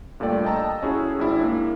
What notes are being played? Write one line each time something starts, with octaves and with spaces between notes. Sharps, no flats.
G2 A#2 A3 A4 D5 G5
D#5 G5 A5 A#5 E6
C#4 E4 F#4 G#4
G#1 D4 E4
A#3 E4